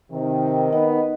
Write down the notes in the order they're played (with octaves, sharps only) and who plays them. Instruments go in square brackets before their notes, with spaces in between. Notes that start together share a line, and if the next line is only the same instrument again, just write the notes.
[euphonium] C3 [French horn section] D#3
[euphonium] B3 [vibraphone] D#4 D#5